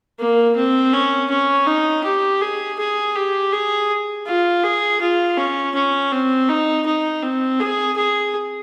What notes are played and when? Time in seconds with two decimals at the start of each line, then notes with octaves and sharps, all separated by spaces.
0.19 A#3
0.56 C4
0.93 C#4
1.30 C#4
1.66 D#4
2.04 G4
2.41 G#4
2.79 G#4
3.15 G4
3.52 G#4
4.27 F4
4.64 G#4
5.01 F4
5.37 C#4
5.75 C#4
6.12 C4
6.49 D#4
6.86 D#4
7.23 C4
7.60 G#4
7.96 G#4